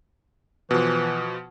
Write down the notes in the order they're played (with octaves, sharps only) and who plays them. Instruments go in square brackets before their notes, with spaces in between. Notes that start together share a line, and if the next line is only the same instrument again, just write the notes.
[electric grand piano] B2 F3 [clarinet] E3